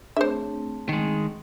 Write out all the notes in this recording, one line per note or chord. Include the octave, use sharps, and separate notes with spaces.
A3 C4 D4 G#4 C5 C#5 E5
D#3 G#3